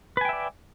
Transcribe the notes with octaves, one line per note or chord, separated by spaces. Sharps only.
B4 D5 E5 G5 G#5